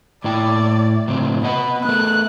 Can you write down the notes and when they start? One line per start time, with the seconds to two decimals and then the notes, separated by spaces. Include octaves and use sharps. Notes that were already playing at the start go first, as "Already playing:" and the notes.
0.24 A2 E4 D5 G5
1.08 A2 C#3 C4
1.43 B3 B4 D#5 F#5
1.85 A3 B3 F#6